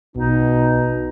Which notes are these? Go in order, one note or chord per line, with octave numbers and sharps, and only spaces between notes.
B1 B2 D#4